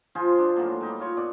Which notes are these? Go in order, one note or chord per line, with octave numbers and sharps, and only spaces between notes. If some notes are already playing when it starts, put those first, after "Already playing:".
F3 F4 G#4 C5
D4
A2 F#3 A#3
G3 D#4
F4 C#5
B2 D5